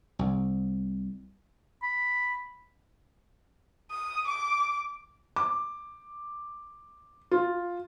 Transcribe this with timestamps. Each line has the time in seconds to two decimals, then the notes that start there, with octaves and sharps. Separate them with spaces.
0.19 C2
1.83 B5
3.91 D#6
4.27 D6
5.36 D6
7.31 F4